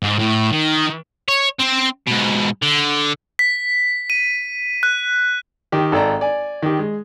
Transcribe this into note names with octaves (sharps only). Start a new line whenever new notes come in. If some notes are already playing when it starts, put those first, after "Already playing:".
G#2
A2
D#3
C#5
C4
G#2 B2
D3
B6
D#7
F#6
D#3 G4
G#1 A4 D5 G5 A#5
D5 G#5
D#3 G4
G#3